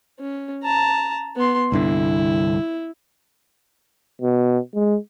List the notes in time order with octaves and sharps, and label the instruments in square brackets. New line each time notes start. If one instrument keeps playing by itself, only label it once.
[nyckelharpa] C#4
A5 A#5
B3 C6
[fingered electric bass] C2 G2 D3 [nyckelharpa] E4
[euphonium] B2
G#3